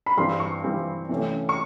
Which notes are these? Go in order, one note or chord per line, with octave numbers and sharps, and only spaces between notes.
B5
G2 E3 G3 C4 C6
C#6
G2 E3 G3 C4
C3 E3 A3 C#4
C#6